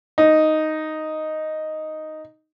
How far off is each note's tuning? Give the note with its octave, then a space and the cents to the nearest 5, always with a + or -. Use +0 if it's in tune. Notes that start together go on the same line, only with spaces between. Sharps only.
D#4 +0